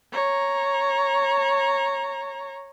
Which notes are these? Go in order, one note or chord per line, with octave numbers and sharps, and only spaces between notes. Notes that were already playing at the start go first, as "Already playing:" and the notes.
C#5 A#5